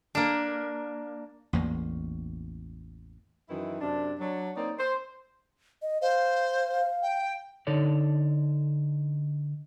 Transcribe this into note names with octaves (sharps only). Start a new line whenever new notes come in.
A#3 D4
A1 E2 A#3
F#2 D#3 E3 E4
F#2 C3 D4
F#3 D4
A#3 C4 D#4 C#5 D5
C5
D#5
C5 F5
G5
D3 D#4 A4 C#5 D5